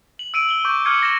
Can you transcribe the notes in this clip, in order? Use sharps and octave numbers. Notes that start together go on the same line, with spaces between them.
F#7
E6 D7 D#7 F#7
F#7 G7
C#6 D6 G6
D6 F6 G#6 C#7
A#6 E7